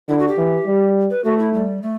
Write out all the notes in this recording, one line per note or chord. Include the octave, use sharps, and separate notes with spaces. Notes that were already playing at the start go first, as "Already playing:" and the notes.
D3 E4
F#4
G4
E3
G3
B4
A3 F#4
E4
G3
A3